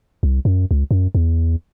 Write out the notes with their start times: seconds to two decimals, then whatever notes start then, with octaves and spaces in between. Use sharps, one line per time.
0.23 C2
0.45 F#2
0.71 C#2
0.91 F#2
1.15 E2